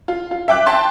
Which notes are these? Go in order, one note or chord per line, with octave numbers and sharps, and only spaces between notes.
F4
F4
E5 G5 D6 F#6
G5 A5 C6